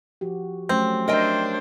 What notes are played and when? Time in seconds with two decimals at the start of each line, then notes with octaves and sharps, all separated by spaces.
0.21 F3 F#4 G4
0.69 F#3 A3 C4 C#4
1.08 D4 A#4 C5 C#5 D#5 E5 G5